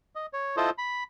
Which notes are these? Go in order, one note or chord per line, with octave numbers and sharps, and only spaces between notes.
D#5
C#5
E4 F4 A4 C5 D#5
B5